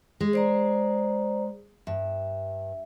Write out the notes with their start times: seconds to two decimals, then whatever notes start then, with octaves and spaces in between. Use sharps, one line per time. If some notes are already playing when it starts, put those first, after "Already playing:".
0.20 G#3
0.33 C5 D5 A#5
1.87 G2 E5